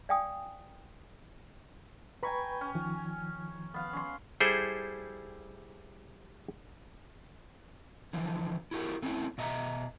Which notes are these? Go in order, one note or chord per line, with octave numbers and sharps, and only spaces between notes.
D5 F5 G5 G#5 D#6
B4 G5 G#5 A#5 B5 C#6
C#4
D#3 F3
B3 F5 F#5
C#4 C6
G3 E4 G#4 A4 C5
D3 E3 F3
E4 F#4 G4 A#4
A3 C4 C#4 E4
B2 D#5 E5 A#5